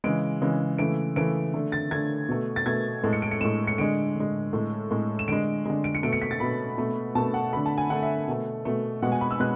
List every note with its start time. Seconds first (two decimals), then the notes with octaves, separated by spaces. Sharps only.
0.04 C#3 E3 G#3 D7
0.41 C#3 E3 G#3
0.78 C#3 E3 A3 D7
1.16 C#3 E3 A3 D7
1.54 D3 A3
1.72 A6
1.91 D3 A3 G#6
2.29 B2 A3
2.56 A6
2.66 B2 A3 G#6
3.03 A2 G#3
3.13 C#7
3.22 D7
3.31 C#7
3.41 A2 G#3 E7
3.67 C#7
3.78 D3 G#3 D7
4.16 D3 G#3
4.53 A2 G#3
4.91 A2 G#3
5.19 E7
5.27 D3 G#3 D7
5.65 D3 G#3
5.84 D7
5.95 C#7
6.03 B2 A3 D7
6.13 C#7
6.22 B6
6.31 A6
6.40 B2 A3 B5
6.78 B2 A3
7.15 B2 A3 A5
7.34 F#5
7.53 D3 A3 B5
7.66 A5
7.78 G#5
7.90 D3 A3 F#5
8.03 E5
8.28 B2 A3
8.65 B2 A3
9.02 B2 G#3 F#5
9.12 G#5
9.21 B5
9.31 E6
9.40 B2 G#3 F#6